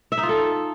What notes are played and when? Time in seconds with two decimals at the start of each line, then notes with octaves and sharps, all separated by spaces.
0.12 E5
0.17 D#4
0.23 F4
0.29 A4